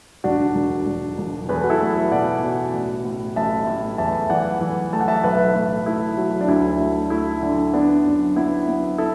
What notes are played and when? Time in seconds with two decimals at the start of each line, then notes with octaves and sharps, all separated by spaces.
0.24 E1 D4 F#4
0.55 E1
0.86 E1
1.18 E1
1.49 E2 B4
1.56 A4
1.64 F#4
1.70 E4 A4
1.81 A3
2.12 B2 D5 F#5
2.43 B2
2.73 A1
3.05 A2
3.36 A1 E5 A5
3.67 A2
3.98 E2 E5 A5
4.29 E3 D5 F#5
4.61 E3
4.93 A3 A5
5.01 F#5
5.08 E5 A5
5.23 B1 B4 E5
5.55 A2
5.86 A3 E4
6.17 F#3
6.41 D4
6.48 D2 E4
6.79 A3
7.10 A3 E4
7.42 D3
7.73 B3 D4
8.05 F#2
8.36 B3 E4
8.67 B3
8.98 E4 A4